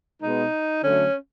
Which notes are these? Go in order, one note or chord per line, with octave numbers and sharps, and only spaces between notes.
B2 G#3 B3 D#4
D3 F#3 A3 C#4